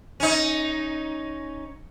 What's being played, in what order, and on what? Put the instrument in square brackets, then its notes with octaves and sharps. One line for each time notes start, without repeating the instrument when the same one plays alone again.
[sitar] C#4 D#4